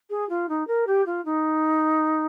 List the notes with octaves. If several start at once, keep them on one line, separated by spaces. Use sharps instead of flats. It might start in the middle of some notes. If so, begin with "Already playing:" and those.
G#4
F4
D#4
A#4
G4
F4
D#4